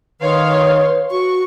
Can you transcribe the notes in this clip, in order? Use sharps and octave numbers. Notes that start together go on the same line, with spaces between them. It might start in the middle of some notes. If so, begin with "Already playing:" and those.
D#3 B4 C#5 F5 C6
F#4 C#6